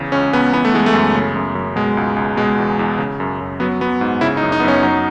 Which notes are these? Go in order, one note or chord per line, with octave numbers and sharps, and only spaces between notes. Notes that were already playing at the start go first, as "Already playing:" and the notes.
Already playing: E2 C#3
C#2 C#4
C#2 B3
E3 B3
A3
E3 G#3
A3
F#2
C#3
F#2
F#2
B2 G#3
C#2
C#2
B2 G#3
E2
E2
C#3
F#2
F#2
F#3 B3
F#3 B3
G#2
C#3 E4
D#4
F#2
D#4
B3
F#2 C#4
F#3 D#4